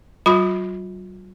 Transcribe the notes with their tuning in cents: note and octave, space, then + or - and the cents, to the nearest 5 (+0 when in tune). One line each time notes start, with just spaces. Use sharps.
F#3 +40 F4 +40 B5 +0